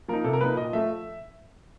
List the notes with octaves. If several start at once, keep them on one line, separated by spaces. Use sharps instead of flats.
F3 A#3 D#4 A#4
C3 A4
A#4
F3 A#3 D#4 B4
A#2 D#5
F3 A3 E5